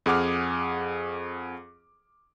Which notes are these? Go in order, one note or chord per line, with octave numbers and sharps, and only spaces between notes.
F2 G#4 F#5 D6 F6